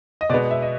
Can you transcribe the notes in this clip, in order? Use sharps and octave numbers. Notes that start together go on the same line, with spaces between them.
D#5
B2 G#3 B3 D5
E5
D#5